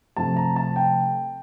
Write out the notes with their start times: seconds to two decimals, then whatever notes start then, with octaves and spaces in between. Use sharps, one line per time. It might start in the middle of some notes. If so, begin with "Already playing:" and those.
0.17 C3 F3 A3 C4 A5
0.37 A#5
0.56 A5
0.76 G5